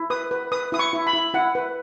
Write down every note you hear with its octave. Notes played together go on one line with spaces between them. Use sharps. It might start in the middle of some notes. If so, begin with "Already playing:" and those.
Already playing: E4
B4 D#6
B4
B4 D#6
E4 D#6
C#6
E4
B5
E4
E4 F#5
B4